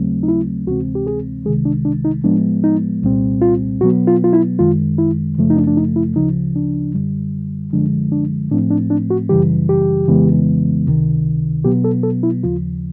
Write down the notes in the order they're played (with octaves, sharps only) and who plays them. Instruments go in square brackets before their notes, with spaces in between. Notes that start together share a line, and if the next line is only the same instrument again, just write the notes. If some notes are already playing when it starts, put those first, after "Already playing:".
Already playing: [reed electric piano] D#2 C#3 F#3 A3 C4
D#4
E4
D2 C3 E3 G#3 C4 F#4
G4
G#4
C2 C3 D#3 G#3 G#4
D4
D4
D#4
A2 F3 G#3 B3 D4
D#4
C2 A#2 G3 C4
F4
B2 F#3 B3 F#4
F4
F4
E4
F#2 D#3 G#3 F4
E4
F#2 C#3 F3 A3
D#4
D4
D4
D#4
E4
D2 C#3 F3 D#4
D4
F#2 D3 G3
F#2 D3 F3 G#3 D4
D4
A2 F3 A3 C4 D4
D4
D4
F#4
F#2 C#3 E3 G3 G4
G4
F2 C#3 E3 G#3 B3
C#2 C3 D#3
B2 F#3 B3 G4
A4
A4
E4
D#2 C#3 F3 F4